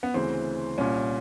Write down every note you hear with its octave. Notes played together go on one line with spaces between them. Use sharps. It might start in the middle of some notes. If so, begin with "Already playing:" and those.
B3
D2 C#3 E3 C4
C2 A#2 C#4